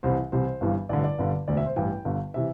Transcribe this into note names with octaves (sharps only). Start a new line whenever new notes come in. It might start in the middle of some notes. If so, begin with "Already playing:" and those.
C2 C3 E3 C5
C2 C3 E3 C5
G1 G2 E3
A1 G2 D3 D5
D5
G1 G2 D3
E1 D2 D3 D5
E5
C5
A1 G2 E3 G5
G1 G2 D3
C3 E3 E5